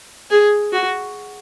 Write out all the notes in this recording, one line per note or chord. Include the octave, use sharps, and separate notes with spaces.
G#4
F#4